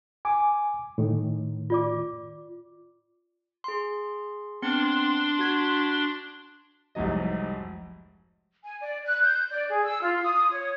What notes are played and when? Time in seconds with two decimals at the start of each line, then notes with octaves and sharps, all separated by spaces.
0.25 G#5 D6
0.98 A2 D#3
1.70 F4 D5 D6
3.64 G#4 C6
4.62 B3 C4 D4 C6 C#7
5.39 F#4 G#6 B6
6.95 F1 C2 G#2 F#3 D#5
8.64 G#5
8.81 D5
9.05 F#6
9.23 G6
9.51 D5
9.69 G#4
9.85 E6
10.02 F4
10.22 D#6
10.52 C#5